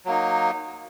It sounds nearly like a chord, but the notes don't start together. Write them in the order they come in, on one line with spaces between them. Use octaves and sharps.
F#3 A#3 D#4